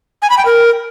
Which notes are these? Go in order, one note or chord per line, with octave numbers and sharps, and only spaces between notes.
G#5
B5
G5
A#4